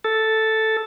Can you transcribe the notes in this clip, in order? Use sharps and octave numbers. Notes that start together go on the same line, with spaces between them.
A4